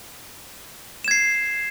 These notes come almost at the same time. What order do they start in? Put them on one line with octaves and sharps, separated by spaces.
E7 G#6 C7